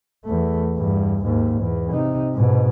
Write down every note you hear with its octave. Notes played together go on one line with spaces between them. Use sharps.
E2 A3
E2 G2
D#2 G#2
E2
C3 D#4
G#2 B2